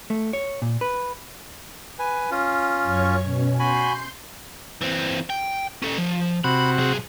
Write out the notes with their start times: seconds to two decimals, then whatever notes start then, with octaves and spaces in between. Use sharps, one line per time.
0.10 A3
0.33 C#5
0.62 A#2
0.81 B4
1.99 B4 G#5
2.31 C#4 F4
2.83 F#2 C#5 C#6
3.23 B2 C#4
3.59 F#4 G#5 B5 C6 G6
4.81 E3 C4
5.30 G5
5.82 C#4 A4
5.98 F3
6.44 C3 F#4 B5
6.78 B1 G#4